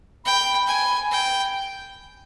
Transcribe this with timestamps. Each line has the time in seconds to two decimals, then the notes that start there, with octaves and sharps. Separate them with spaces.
0.25 G5 B5
0.67 G#5
1.11 G5